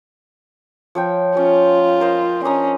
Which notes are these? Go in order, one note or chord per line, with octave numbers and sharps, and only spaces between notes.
F3 C#5 G5
C#4 F4
A#4 C5 D#5
C#4 D4 D#5 A#5